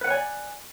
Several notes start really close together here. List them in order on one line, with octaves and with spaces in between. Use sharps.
B4 F#5 C#5 G#5 D5